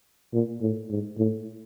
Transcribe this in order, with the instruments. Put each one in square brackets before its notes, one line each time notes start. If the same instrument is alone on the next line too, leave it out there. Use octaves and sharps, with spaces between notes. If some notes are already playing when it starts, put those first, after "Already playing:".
[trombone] A#2
A2
G#2
A2